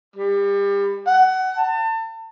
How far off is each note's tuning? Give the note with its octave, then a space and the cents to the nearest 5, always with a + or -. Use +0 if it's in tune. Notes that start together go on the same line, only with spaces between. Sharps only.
G3 +30
F#5 +20
A5 +35